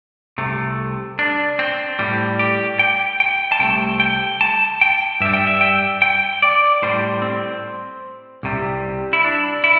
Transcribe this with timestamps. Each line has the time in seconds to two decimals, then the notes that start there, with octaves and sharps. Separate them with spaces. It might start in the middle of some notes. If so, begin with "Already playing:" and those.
0.38 C2 C3 A3
1.19 D4
1.59 C4
1.99 A2 G3
2.39 G4
2.79 G5
3.20 G5
3.52 A5
3.59 C2 C3 A3 G5
4.00 G5
4.41 A5
4.81 G5
5.20 G2 G3 E5
5.33 G5
5.47 E5
5.61 G5
6.02 G5
6.42 D5
6.82 A2 G3 C5
7.22 C4
8.43 C2 C3 G3
9.13 E4
9.24 D4
9.64 E4